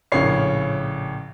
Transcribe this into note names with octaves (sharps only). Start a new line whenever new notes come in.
A#1 A2 C#3 C#4 C#5 C7